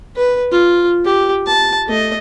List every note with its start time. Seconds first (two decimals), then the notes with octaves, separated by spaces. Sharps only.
0.16 B4
0.52 F4
1.05 G4
1.47 A5
1.88 A3 D#5